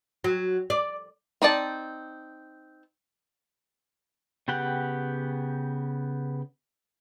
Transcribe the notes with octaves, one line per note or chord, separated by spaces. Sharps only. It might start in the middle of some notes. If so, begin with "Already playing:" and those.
F#3
D5
C4 D#4 D5 A5
C#3 B3 G4 F#5 G5